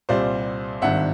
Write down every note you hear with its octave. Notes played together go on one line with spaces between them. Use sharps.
C2 A#2 G3 C5 D5
G#1 G2 D#3 E5 F#5